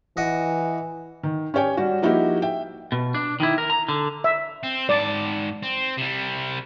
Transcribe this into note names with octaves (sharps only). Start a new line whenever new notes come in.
E3 F#4 D#5
D#3
C#4 G4 C#5 G5 G#5
G3 F#4
F3 A#3 D#4 E4 F#4 G4
E5 G5
B2
D4
D#3 E4
A#4
A#5
D3
E5
C4
G#2 D5 A5
C4
C3 G3